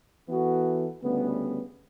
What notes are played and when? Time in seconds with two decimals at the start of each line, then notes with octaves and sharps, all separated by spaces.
0.28 E3 B3 F#4 A4
1.02 D2 C#3 G3 B3